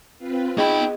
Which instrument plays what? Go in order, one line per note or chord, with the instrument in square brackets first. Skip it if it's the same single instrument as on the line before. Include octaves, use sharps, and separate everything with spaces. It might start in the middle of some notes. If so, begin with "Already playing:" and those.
[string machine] C4 F4 B4
[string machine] B3 [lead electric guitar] D#4 B5 [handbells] G#4 D#5 [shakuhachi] G5